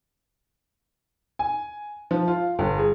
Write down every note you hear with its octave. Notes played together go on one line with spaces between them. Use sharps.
G#5
F3
F4
G1
G#4